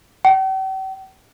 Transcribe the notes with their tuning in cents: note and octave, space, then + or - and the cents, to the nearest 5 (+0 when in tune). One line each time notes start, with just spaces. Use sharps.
G5 -45